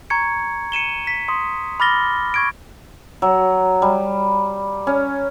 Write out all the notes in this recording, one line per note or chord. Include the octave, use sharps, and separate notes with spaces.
A#5 C#6 G#6 C#7
C#7 D#7 E7 G7
B6
C6 D#6
B5 D6 F6 A6 A#6 G7
C#6 G#6 D7
F#3
G3
C#4